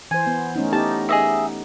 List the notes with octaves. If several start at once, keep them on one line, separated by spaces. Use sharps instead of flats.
E3 C5 G#5
B3
A3 C#4 D#4
B3 D#4 G4 A5
G#4 D#5 E5